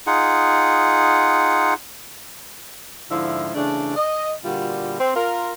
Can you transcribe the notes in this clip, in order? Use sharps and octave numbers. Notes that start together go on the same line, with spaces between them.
D#4 F4 G#4 F#5
G#2 D3 F3 E4
C#3 E3 A3 D4
D#5
A#2 D3 G3 F4 F#4
C4
F4 A#4